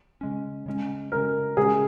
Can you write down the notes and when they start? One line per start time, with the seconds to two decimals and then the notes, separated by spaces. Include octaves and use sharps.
0.21 C#3 G#3 C#4
0.66 C#3 G#3 C#4
1.12 C#3 G#3 C#4 A#4
1.57 C#3 G#3 C#4 G#4